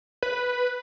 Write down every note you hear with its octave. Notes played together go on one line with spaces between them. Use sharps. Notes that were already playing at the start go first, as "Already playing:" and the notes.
B4